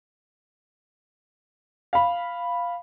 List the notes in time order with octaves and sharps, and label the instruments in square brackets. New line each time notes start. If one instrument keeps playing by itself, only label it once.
[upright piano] F5 B5